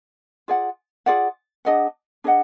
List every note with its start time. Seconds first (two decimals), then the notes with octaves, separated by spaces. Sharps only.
0.48 F4 G#4 D5 F#5
1.06 F4 G#4 D5 F#5
1.65 D4 G#4 D#5 F#5
2.24 D4 G#4 D#5 F#5